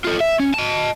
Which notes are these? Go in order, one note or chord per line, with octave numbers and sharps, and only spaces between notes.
F4 A4
E5
C#4
D#5 A5